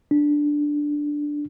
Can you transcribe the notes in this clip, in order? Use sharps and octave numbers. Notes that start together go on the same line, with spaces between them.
D4